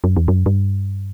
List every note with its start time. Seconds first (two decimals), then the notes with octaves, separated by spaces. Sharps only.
0.04 F#2
0.16 E2
0.28 F#2
0.46 G2